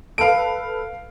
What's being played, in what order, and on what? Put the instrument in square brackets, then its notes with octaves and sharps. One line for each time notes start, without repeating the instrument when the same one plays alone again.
[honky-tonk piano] A4 B4 [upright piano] F5 D7